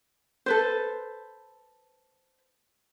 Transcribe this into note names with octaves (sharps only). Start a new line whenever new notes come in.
A4 B4 C5